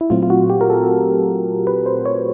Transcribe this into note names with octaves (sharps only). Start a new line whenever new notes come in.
E4
A#2 F#3 A3 C4 F4
F4
F#4
G4
A#4
A4
B4
C5
C#5